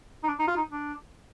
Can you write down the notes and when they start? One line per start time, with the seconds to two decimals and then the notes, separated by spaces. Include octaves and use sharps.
0.23 D#4
0.28 D4
0.39 D#4
0.48 F4
0.57 D#4
0.72 D4